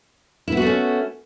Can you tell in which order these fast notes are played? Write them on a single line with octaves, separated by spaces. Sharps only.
E4 B3 F#4 A3 C#4